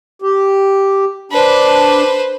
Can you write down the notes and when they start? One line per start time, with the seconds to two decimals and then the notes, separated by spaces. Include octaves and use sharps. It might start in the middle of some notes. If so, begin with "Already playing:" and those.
0.22 G4
1.32 D4 B4 C5